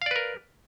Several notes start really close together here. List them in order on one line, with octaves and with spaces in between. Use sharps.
F5 D5 B4 A#4